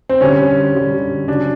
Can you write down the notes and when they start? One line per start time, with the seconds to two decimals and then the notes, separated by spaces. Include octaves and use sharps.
0.09 C4
0.21 D3 G3 C#4
0.75 D3 G3
1.28 C#3 F#3 D4